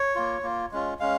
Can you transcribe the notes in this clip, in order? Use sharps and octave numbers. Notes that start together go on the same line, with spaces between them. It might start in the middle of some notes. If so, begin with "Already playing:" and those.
Already playing: C#5
A#3 F4
A#3 F4
G#3 C#4 F4
G#3 C#4 F5